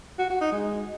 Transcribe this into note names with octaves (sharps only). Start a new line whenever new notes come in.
F#4
F#4
D#4
G#3